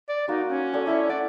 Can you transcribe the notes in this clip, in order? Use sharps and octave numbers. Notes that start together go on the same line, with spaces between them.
D5
A#3 D#4 F#4 C6
C#4
A4 D5 G#5
A3 E4 E5
D5 F#5